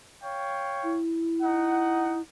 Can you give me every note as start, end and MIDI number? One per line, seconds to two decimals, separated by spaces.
0.23 0.99 73
0.23 0.99 77
0.23 0.99 79
0.83 2.20 64
1.42 2.19 63
1.42 2.19 78